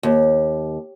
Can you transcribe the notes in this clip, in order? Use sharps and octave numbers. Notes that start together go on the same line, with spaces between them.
D#2